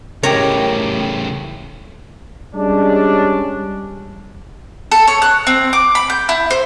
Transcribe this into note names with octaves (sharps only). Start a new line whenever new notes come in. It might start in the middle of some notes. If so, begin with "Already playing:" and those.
A2 C#3 A3 G4 A#4 C#5 A#5
G3 G#3 C#4 D4
A4
C#5
F#6
C4
D6
B5
G6
E4
C5